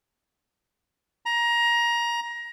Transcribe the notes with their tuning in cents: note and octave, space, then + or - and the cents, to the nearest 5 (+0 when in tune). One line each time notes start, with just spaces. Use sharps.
A#5 +20